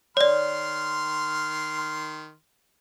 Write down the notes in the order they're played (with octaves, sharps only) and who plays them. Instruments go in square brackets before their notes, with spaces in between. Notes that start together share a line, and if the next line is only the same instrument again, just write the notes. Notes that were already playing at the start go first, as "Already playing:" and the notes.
[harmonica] D#3 C6 F6 [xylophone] C#5 D5